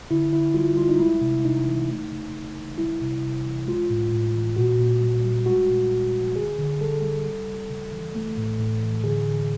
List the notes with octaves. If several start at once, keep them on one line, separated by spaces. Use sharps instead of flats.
D3 E4
D3 E4
G3 F4
G3 F4
D#4
G#3 E4
C3
C3 D#4
E3
A3
C#3
C#3
E3
G3 E4
C3
C3
E3
G#3 F4
A2
A2
E3
A#2 F#4
A#2
G3
G3
G#3 F#4
A#2
A#2
F3
D3 G#4
D3
G3 A4
G3
G3
C#3
C#3
E3
A3
A2
A2
E3
D3 G#4
D3